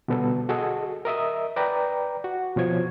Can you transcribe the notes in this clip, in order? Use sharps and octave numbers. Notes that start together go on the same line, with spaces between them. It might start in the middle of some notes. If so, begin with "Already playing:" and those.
B2 D3 G3 B3 A4
F#4 G#4 A4 D#5
A#4 D#5 E5 D#6
B4 D5 G5 A#5
F#4
B2 F3 C#5 G#6